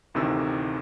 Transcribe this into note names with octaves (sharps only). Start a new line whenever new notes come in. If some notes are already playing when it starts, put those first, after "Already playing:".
A1 D2 A2 C3 D#3 E6